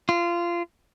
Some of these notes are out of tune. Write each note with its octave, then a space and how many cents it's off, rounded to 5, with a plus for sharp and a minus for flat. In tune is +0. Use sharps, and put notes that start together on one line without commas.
F4 -20